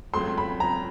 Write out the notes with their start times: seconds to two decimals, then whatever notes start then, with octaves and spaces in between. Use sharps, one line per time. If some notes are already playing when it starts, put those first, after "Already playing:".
0.14 C#2 C#3 F#3 A3 C4 C6
0.38 B5
0.60 A#5